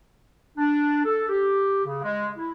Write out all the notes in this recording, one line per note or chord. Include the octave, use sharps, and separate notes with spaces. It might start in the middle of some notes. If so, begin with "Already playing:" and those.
D4
A4
G4
C#3
G#3
E4